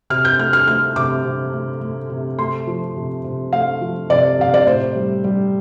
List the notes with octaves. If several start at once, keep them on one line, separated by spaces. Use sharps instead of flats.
C3 F6
G6
A3 F6
F6
A3 F6
C3 D6
C3
A3
A3
C3
A3 C6
F3
C3
C3
A3 F5
F3
C3 D5
C3 F5
D5
A2 C5
G3
G3